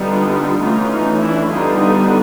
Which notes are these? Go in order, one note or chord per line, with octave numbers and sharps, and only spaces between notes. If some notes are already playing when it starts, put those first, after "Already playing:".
Already playing: D3 G3 B3 D4 D#4 F4
E3 A3 C#4 D#4 F4
D#4
D4 E4
D3 G3 B3 D4 D#4 F4
D#4 F4